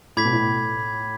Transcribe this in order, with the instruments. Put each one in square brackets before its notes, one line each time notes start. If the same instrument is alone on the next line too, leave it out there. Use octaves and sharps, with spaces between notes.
[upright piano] A2 [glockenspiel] B5 D6 G#6 B6
[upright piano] B2
A2